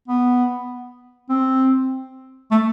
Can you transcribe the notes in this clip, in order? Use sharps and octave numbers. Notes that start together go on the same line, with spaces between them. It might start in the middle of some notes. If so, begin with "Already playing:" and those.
B3
C4
A3